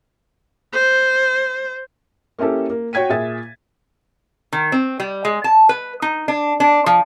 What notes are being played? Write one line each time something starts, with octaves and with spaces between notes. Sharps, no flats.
C5
A#3 C#4 E4 G4 A4
A#3
F#4 C#5 G5 G#6 B6 D#7
A#2 G#4 E5 A6
D#3
C4
G3
G#3
A5
B4
D#4
D4
D4
F3